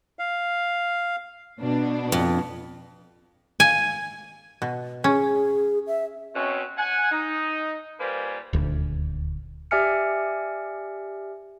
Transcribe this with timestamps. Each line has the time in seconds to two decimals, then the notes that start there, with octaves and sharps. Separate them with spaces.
0.19 F5
1.61 B2 B3 D4
2.12 F2
3.60 G#5
4.62 B2
5.04 C#4 G#4
5.87 E5
6.35 B2 C4 C#4
6.78 F#5 G#5
7.12 D#4
8.00 A#2 G3 A#3 B4 C5 G#5
8.53 D#1 D2
9.71 G4 D5 E5 G#5 F6 C#7